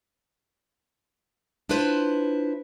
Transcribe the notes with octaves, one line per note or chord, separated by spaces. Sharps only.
D4 E4 F4 B4 C5